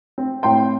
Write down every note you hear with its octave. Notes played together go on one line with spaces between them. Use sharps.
C4
A2 G5 C6